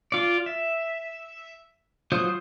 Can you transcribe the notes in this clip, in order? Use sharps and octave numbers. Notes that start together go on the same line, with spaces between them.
F4 D5
E5
F#3 F4 C5 D#6